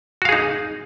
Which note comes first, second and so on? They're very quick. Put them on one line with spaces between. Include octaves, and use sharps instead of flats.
F#4 F5 G#4 D#4